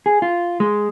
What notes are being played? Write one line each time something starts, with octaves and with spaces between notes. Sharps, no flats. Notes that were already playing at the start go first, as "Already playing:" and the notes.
G#4
F4
G#3